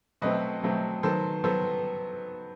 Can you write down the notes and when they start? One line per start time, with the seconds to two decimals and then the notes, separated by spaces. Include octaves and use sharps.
0.22 B2 F#3 A3 C4 B4 D#5
0.63 B2 F#3 A3 C4
1.03 D#3 F#3 B3 A4 C5
1.44 F#3 B3 A4 C5